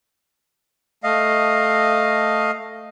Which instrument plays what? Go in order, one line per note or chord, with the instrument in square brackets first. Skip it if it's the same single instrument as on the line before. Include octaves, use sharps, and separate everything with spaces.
[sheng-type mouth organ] A3 D#5 F5